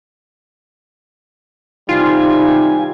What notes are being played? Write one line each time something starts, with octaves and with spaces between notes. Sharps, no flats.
C3 D#3 G3 F4 G#5